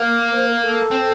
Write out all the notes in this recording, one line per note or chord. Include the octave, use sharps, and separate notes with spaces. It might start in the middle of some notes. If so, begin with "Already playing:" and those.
Already playing: A#3
C5
A#4
A4
C4